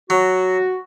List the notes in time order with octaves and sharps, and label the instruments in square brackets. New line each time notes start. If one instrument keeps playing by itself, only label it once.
[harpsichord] F#3 [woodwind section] F#4